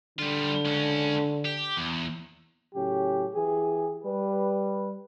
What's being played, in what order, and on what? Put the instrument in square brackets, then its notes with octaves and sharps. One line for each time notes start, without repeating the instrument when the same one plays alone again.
[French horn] D3 [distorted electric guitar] G3 F4
[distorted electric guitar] C#2 C#4
G4
E2
[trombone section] A2 C#3 F#3 C#4 G4
E3 G4 G#4
G3 B4